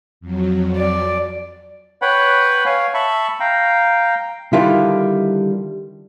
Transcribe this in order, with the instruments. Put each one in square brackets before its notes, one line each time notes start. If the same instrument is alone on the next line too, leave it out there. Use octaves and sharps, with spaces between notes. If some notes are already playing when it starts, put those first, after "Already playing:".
[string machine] F2 F#3
[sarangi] D5
[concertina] B4 C#5 F#5 G5 B5
C#5 F5 G#5
E5 A5 B5 C#6
F5 G5 A#5
[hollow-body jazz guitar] D3 D#3 G3 E4 F4